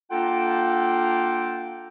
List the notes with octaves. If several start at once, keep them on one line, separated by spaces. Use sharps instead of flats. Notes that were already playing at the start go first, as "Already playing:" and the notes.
A#3 D4 F4 A4 F#5 G5